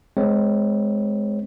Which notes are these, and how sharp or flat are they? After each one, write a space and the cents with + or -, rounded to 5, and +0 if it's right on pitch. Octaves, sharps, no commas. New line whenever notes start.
G#3 +10 C4 -25 C#5 +0